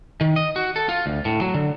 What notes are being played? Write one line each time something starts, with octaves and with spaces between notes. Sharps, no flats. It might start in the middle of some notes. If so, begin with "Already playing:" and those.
D#3
D#5
F#4
A4
F4
D2
A2
F#3
D3